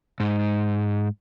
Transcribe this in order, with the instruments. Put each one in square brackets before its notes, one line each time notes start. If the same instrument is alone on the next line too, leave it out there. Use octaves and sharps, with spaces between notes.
[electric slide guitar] G#2